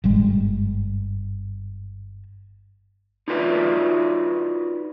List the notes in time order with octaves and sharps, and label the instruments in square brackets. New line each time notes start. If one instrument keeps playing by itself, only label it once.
[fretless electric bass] G1 G#2 G3 G#3
[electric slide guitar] D#4 F4 F#4 B4 D5 E5